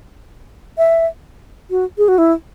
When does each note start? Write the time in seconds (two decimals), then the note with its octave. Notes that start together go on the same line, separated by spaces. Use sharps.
0.78 E5
1.71 F#4
1.98 G#4
2.08 F#4
2.18 E4